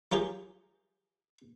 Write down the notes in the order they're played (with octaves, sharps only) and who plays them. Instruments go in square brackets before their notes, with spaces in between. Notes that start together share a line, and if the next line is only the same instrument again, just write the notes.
[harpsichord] F#3 F4 G4 G#4